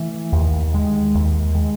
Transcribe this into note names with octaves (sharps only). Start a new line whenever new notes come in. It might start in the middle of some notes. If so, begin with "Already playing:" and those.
Already playing: E3 A3
D#2
D#3 G#3
D#2
D#3 G#3